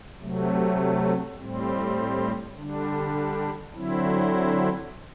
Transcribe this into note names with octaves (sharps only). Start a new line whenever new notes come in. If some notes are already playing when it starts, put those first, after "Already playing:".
C3 F#3 A3
A2 G3 C4
D3 G3 D4
D3 F#3 C4 E4